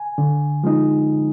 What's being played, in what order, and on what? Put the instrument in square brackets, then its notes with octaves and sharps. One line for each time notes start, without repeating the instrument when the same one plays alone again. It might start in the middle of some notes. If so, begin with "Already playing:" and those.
Already playing: [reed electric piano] G#5
D3
F3 G#3 D#4